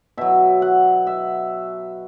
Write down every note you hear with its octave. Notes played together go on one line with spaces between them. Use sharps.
B2 F#3 E5
F#5
E5